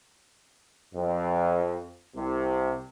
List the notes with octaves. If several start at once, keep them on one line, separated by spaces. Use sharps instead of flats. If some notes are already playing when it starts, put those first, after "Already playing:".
F2
C2 C3